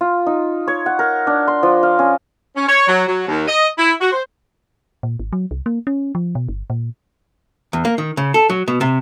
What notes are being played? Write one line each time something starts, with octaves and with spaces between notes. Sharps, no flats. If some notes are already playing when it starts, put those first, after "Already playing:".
F4
D#4
C#5
F#5
A#4
D4
C6
F3
F5
C#4
C#4
C#5
F#3
F#3
D#2
D#5
E4
F#4
C5
A#2
G#1
F#3
C2
A#3
C#4
F3
B2
G1
A#2
E2
A#3
D#3
C#3
A4
F#3
B2
C3